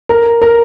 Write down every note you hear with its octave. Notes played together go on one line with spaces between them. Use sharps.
A#4
A#4